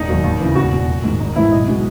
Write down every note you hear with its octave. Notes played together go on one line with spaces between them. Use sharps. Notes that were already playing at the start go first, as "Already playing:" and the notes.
Already playing: E1 D#4
D#2 D#3 F#3
D#2
C#3 E3
E1 F#4
E2 B2
A#1
G#2 D#3 G#3
G#1 D#4
G#2 E3 G#3 E4
B1 D#5
B2 G#3